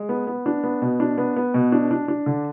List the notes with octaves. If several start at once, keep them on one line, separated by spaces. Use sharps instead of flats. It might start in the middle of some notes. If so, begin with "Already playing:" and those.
Already playing: G#3
B3
B3
D4
B3
B2
D4
B3
B3
B2
D4
D4
D4
D3